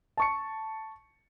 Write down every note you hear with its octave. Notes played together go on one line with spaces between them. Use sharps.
A5 C#6 C#7